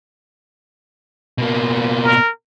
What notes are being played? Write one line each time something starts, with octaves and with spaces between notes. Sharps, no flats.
B2 A#3
A#4